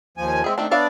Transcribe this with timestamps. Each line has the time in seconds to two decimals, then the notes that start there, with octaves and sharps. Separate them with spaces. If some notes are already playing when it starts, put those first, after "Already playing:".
0.18 D#2 F3 G#5
0.44 G#3 C4 G#4 E5
0.58 D#3 A3 C4 D4
0.71 B3 D4 C#5 D5 E5 F5